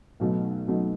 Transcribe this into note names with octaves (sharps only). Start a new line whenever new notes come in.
B1 B2 F#3 A3 D#4
B1 B2 F#3 A3 D#4